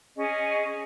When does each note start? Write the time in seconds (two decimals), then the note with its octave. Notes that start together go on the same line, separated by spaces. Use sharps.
0.16 C#4 G#4 D#5